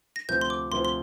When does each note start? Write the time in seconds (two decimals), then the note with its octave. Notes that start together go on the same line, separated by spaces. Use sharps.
0.16 A#6
0.28 D2 C3 F3 C4 G6
0.41 C6
0.50 D6
0.71 D2 C3 F3 C4 C6
0.85 C6